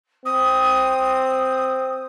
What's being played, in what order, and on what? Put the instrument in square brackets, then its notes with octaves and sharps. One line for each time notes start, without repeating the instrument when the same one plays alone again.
[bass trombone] C4 [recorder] D#6